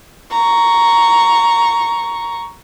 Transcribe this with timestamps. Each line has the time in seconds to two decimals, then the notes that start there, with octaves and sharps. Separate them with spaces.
0.31 A#5 C#6